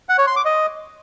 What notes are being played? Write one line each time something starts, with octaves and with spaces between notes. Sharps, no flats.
F#5
C#5
C6
D6
D#5